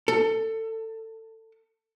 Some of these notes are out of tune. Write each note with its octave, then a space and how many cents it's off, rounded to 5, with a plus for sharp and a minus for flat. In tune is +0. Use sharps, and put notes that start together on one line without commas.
A4 +20